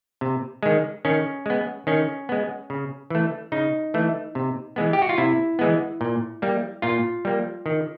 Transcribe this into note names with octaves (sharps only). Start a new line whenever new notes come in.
C3
D#3 G#3
D#3 C#4
G#3 B3
D#3 C#4
G#3 B3
C#3
E3 A3
C#3 D#4
E3 A3
C3
E3 G#3 B3
G4
F#4
F4
C3 E4
E3 G#3 B3
A#2
G3 A#3
A#2 F4
G3 A#3
D#3